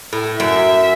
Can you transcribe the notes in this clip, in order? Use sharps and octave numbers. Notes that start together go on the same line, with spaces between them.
A2
F#2 E5